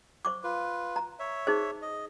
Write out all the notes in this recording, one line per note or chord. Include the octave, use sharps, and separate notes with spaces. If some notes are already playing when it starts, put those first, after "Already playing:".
C5 C#6 D6
F4 B4
A#5
C#5 E5
D#4 G#4 C5
D#5